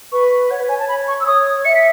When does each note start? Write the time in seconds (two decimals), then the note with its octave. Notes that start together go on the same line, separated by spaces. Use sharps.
0.12 B4 C#6
0.50 C#5 F#5
0.60 B4
0.69 C#5 G#5
0.79 A5
0.88 B5
1.08 C#6
1.20 E6
1.26 C#5 D#6
1.65 E5 C#7
1.75 B6